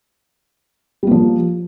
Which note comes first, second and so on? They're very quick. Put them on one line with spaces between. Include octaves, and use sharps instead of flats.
G3 A#3 F3